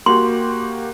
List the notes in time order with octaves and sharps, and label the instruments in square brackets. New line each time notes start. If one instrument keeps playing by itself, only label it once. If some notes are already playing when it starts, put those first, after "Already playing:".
[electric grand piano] A#3 F#4 G4 [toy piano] C6